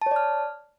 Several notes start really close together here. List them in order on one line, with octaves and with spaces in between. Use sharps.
A5 C#5 D5 F6